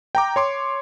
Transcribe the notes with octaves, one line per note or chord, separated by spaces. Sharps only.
G5 A#5 D6
C#5 C6 D6